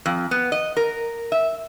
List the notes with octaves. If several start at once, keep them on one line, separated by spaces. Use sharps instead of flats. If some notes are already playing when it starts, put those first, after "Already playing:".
F2
B3
D#5
A#4
E5